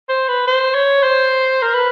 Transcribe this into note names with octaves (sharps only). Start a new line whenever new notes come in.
C5
B4
C5
C#5
C5
A#4
B4